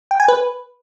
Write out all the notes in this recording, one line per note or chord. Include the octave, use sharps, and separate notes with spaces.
G5
G#5
B4